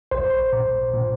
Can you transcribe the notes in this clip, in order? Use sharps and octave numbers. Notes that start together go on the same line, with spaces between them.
A#1 C5
A#2
A#2